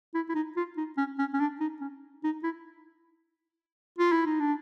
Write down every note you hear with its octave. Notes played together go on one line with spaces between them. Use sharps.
E4
E4
D#4
F4
D#4
C#4
C#4
C#4
D4
D#4
C#4
D#4
E4
F4
E4
D#4
D4